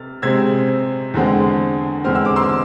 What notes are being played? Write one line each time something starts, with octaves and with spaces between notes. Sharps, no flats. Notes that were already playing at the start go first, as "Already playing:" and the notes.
Already playing: C3 F6 A6
C3 G#3 C4 E6 G#6
E2 D3 G#3 C4
E2 D3 G#3 C4 F6
E6
D6
C6 E6
E6